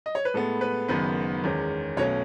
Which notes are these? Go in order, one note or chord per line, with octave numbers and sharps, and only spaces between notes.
D#5
C#5
B4
A2 G#3 B3 A4
B4
F#1 F#2 D#3 G#3 B3 B4
E2 D#3 G#3 C#4
B1 B2 A3 C#4 C#5